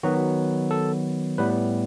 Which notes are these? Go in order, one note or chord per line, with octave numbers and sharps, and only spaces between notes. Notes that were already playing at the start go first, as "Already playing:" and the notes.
D#3 F#3 B3 F#4
A4
A2 G3 B3 B4